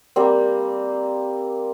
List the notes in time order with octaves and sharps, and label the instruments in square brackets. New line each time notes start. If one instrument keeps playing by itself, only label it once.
[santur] G3 A#3 C4